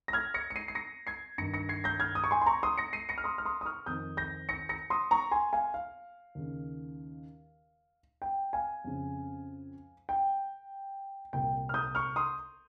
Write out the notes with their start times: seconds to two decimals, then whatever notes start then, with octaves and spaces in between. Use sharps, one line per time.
0.08 A#6
0.13 F6 G#6
0.34 A#6 C#7
0.50 C#7
0.56 C7 D#7
0.68 C7
0.75 A#6 C#7
1.07 G#6 C7
1.38 G2 D#3 A#6 C#7
1.54 A#6 C#7
1.69 G#6 C7
1.84 G6 A#6
2.00 F6 G#6
2.15 D#6
2.24 C#6
2.31 G#5 C6
2.42 C6
2.46 A#5 C#6
2.63 C6 D#6
2.78 A#6 C#7
2.93 C7 D#7
3.09 A#6 C#7
3.18 F6
3.24 C6 D#6
3.38 F6
3.45 C6 D#6
3.61 D#6
3.66 C#6 F6
3.86 F2 D#3 D#6 G6
4.17 G6 A#6
4.49 A#6 C#7
4.69 A#6 C#7
4.90 C6 D#6
5.11 A#5 C#6
5.31 G#5 C6
5.53 F5 G#5
5.74 F5
6.35 D#2 C#3
8.22 G5
8.53 F5 G#5
8.84 F2 C#3
10.09 G5
11.33 C2 A#2 G5
11.69 F6
11.74 D#6 G6
11.95 C#6 F6
12.16 C6 D#6